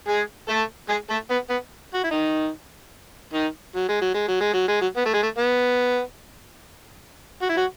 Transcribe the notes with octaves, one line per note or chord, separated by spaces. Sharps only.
G#3 G#4
A3 A4
G#3 G#4
A3 A4
B3
B3
F#4
E4
D#3 D#4
D#3 D#4
F#3
G#3
F#3
G#3
F#3
G#3
F#3
G#3
F#3
B3
A3
G#3
A3
B3
F#4
E4
F#3 F#4